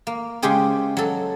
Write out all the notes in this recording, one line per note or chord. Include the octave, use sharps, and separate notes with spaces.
A#3
C#3 G#3 G4 G#4 C5
F#3 A4